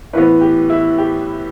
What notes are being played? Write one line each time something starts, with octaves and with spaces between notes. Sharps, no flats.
A2 E3 B3 B4
G4
E4
G4